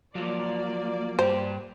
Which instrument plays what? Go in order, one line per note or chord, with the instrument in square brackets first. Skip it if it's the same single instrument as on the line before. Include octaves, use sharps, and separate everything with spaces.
[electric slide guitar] F3 F#3 [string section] A#3 D5
[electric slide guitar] G2 G4 [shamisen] C5